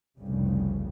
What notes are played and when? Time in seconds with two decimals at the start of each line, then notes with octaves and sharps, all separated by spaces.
0.17 F1 C2 G2 C#3 G3